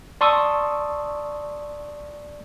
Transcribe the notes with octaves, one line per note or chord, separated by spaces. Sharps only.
D5 A5 C6 C#6 D#6 E6